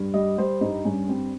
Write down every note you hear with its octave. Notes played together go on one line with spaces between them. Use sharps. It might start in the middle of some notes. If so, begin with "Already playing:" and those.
Already playing: G2
G3 D#5
G3 C5
G2 D#4
G2 C#4
G3 C4